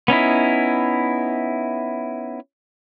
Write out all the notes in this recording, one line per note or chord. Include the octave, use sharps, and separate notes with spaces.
B3 C#4 D#4 E4